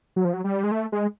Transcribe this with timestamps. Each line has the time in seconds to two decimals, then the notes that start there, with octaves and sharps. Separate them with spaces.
0.16 F#3
0.25 F3
0.33 F#3
0.44 G3
0.64 G#3
0.71 A3
0.92 G#3